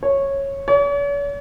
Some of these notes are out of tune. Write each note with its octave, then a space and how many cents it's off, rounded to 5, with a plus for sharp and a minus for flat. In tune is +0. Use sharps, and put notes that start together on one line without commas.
C#5 -10
C#5 +45